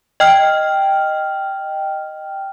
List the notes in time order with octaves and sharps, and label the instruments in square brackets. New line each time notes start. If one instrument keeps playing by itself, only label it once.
[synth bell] D#5 G5 F6